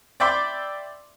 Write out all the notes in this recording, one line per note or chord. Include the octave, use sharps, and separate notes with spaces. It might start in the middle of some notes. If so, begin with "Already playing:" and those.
D5 E5 G5 B5 C6 D6